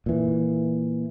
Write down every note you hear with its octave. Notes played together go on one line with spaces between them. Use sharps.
A#2 E3